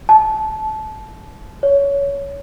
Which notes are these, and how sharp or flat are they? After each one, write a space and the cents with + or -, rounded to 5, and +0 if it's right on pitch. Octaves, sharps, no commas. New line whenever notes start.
A5 -20
C#5 +20